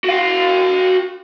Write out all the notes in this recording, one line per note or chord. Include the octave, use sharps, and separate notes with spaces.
F#4 F5